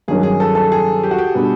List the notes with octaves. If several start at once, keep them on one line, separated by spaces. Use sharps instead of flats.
G2 D#3 F#3 A#3 C#4 G#4
G#4
A4
A4
G#4
G4
F#4
G4
B2 G3 B3 D4